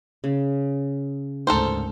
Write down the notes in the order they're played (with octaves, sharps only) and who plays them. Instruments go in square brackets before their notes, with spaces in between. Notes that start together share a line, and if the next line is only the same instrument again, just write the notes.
[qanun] C#3
[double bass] D2 G#2 [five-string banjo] A4 A#4 C5